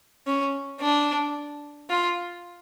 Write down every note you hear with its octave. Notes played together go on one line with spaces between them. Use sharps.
C#4
D4
F4